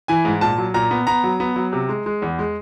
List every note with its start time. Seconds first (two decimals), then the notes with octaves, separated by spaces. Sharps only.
0.08 E3 G#5
0.25 G#2
0.41 A#2 A5
0.58 F#3
0.74 A#2 A#5
0.91 B3
1.07 B3 A#5
1.23 F#3
1.40 B3
1.56 F#3
1.73 C3
1.89 G#3
2.06 G#3
2.22 E2
2.39 G#3